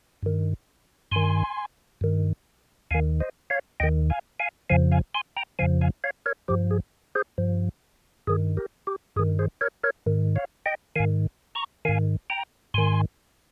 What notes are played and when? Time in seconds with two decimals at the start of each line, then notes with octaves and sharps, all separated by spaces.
0.23 G2 D#3
1.11 G2 D#3 G#5 C6
2.01 G2 D#3
2.91 D#2 D#3 F5 G#5
3.20 C5 D#5
3.50 C#5 F5
3.80 D#2 D#3 D#5 G5
4.10 F5 G#5
4.40 F5 G#5
4.70 F2 C#3 F3 F5 G#5
4.92 F5 G#5
5.15 G#5 C6
5.37 G5 A#5
5.59 F2 C#3 F3 F5 G#5
5.81 F5 G#5
6.04 C#5 F5
6.26 A#4 C#5
6.48 G2 F3 G4
6.71 G#4
7.15 G#4 C5
7.38 G2 F3
8.27 G2 D#3 G#4
8.57 G4 A#4
8.87 G4
9.16 G2 G#4
9.19 D#3
9.39 G#4 C5
9.61 A#4 C#5
9.84 A#4 C#5
10.06 G#2 D#3
10.36 C#5 F5
10.66 D#5 G5
10.96 G#2 D#3 F5 G#5
11.55 A#5 C#6
11.85 G#2 D#3 F5 G#5
12.30 G5 A#5
12.74 G#2 D#3 G#5 C6